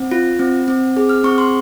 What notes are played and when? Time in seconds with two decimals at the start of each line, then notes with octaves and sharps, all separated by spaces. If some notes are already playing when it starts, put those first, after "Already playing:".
Already playing: C4
0.11 F4
0.39 C4
0.68 C4
0.97 G#4
1.09 F6
1.24 C4 C#6
1.38 C6